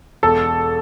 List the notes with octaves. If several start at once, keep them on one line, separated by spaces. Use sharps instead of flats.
E1 A4